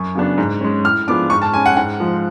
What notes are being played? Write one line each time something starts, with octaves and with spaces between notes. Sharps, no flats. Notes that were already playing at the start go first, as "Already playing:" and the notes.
Already playing: F#2 C#6
C#3 F#3 B3 D4
G#2
G#3 C#4
A2 F6
F3 G#3 B3 D4 D6
G#2 C#6
A5
G#3 C#4 G#5
F#5
G#2 F#5
F3 G#3